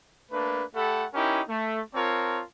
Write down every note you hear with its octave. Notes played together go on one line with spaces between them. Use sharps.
A3 A#3 D4 B4
A3 G4 A4 F#5 B5
C#4 D#4 E4 G4 A#4
A3
C4 F4 A#4 C#5 A5